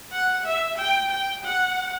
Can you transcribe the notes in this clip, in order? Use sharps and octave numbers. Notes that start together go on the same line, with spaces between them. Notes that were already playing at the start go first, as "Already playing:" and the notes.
F#5
E5
G5
G5
F#5